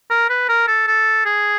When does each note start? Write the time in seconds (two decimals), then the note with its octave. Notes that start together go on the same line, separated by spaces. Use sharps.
0.10 A#4
0.29 B4
0.49 A#4
0.67 A4
0.87 A4
1.25 G#4